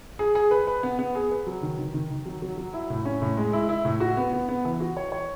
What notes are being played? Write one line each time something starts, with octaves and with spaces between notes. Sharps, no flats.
G#4
G#4
B4
B4
B3
B3
G#4
B4
F#3
D#3
D#3
D#3
D#3
F#3
F#3
F#3
E4
A2
C#4
A2
G#3
E4
E4
A2
F#4
B3
B3
B3
E3
F#4
C#5
C#5